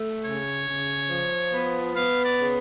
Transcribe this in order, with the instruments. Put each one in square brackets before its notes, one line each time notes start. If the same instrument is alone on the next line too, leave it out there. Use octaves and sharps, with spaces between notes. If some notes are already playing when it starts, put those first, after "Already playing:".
Already playing: [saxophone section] A3
[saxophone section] C#3 [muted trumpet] C#5
[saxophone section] C#3
F3
B3
[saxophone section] B3 [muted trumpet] F5
[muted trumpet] D5
[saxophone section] C#3